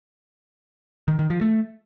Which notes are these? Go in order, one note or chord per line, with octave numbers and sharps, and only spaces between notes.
D#3
D#3
F3
A3